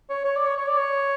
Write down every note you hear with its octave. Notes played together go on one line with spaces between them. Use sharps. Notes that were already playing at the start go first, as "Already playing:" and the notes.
C#5
C#5
D5
C#5
C#5
D5
C#5